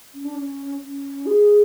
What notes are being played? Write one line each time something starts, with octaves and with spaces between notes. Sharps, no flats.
C#4
D4
C#4
C#4
G#4